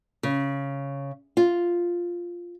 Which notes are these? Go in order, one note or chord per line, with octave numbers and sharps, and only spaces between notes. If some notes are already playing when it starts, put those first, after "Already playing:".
C#3
F4